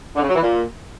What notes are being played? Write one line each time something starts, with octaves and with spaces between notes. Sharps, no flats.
D3
C#3
F#3
E3
A#2